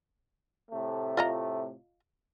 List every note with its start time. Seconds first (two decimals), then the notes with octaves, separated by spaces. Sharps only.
0.71 A2 C3 A3
1.17 F4 D#5 A#5